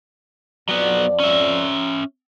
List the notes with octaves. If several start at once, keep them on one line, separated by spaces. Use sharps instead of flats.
F2 F#3 B3 D5
C#4 E5